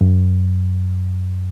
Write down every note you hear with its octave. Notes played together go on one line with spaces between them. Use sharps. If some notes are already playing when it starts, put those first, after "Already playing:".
F#2